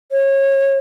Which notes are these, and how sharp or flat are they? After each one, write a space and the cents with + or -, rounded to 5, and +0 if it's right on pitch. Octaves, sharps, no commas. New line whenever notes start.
C#5 -25